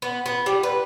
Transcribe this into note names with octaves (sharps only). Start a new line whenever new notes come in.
B3
B3
G3
B4